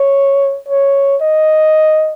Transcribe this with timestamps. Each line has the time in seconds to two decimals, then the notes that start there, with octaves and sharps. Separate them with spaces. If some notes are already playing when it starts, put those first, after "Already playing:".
Already playing: C#5
0.69 C#5
1.21 D#5